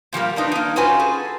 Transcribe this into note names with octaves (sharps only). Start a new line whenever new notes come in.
A#2 F3 G3 A#3
C4 D4 D#4 B4
A#3 D#4
C#4 F4 F#4 B4 C5 G#5
G#4 A4